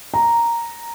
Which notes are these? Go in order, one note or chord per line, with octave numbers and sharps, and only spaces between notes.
A#5